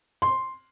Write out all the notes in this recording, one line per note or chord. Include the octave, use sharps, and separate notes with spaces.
C6